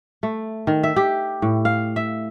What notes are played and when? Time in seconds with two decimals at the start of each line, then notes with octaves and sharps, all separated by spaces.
0.23 A3
0.67 D#3
0.83 E5
0.96 G4
1.42 A2
1.65 F5
1.96 E5